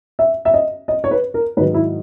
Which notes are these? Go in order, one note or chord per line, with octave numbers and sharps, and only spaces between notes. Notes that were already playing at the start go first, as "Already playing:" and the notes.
E5
E5
D#5
D#5
C#5
B4
A#4
G#2 D#3 F#3 B4
E4